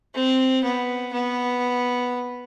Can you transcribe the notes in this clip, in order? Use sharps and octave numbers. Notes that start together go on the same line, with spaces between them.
C4
B3
B3